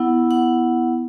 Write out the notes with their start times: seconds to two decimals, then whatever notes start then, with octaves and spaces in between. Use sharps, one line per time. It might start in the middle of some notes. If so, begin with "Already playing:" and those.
Already playing: B3 E4 F#5
0.31 F#5